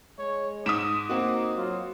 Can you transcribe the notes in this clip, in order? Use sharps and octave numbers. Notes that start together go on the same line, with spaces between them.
G#3 C#5
G#2 D6 D#6 B6 E7
A#3 C4 D#4 F#4
F#3 F4